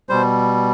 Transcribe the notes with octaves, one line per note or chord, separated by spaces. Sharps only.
B2 G3 C5